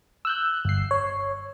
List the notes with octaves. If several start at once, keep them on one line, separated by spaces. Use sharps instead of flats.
E6 F#6 G6
G1 C7
C#5